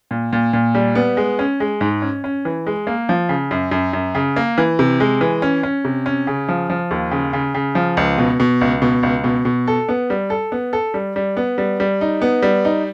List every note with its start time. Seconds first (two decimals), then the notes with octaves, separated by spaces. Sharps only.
0.11 A#2
0.33 A#2
0.53 A#2
0.75 G3
0.95 B3
1.17 G#3
1.39 C#4
1.60 G#3
1.81 G#2
2.02 C#4
2.24 C#4
2.45 E3
2.66 G#3
2.87 A#3
3.09 F3
3.29 C#3
3.51 F#2
3.72 F#2
3.93 F#2
4.15 C#3
4.36 A#3
4.58 E3
4.79 C3
5.00 G#3
5.21 E3
5.42 C#4
5.63 C#4
5.84 C3
6.06 C#4
6.27 C#3
6.49 F3
6.70 F3
6.91 D#2
7.11 C#3
7.33 C#3
7.55 C#3
7.75 F3
7.97 C#2
8.18 B2
8.40 B2
8.61 C#2
8.82 B2
9.03 C#2
9.24 B2
9.45 B2
9.68 A4
9.89 B3
10.10 G3
10.30 A4
10.52 B3
10.73 A4
10.94 G3
11.16 G3
11.37 B3
11.58 G3
11.80 G3
12.01 D#4
12.22 B3
12.42 G3
12.65 D#4